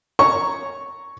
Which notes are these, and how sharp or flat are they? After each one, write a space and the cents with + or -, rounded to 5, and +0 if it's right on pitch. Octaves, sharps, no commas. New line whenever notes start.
C#5 +0 A#5 -5 C#6 +0